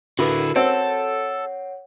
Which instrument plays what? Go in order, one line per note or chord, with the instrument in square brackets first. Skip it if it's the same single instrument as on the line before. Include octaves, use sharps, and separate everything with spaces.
[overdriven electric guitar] D3 E4 [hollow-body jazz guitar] F#4 A#4 B4
[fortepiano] C4 [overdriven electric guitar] A4 [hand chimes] C#5 F#5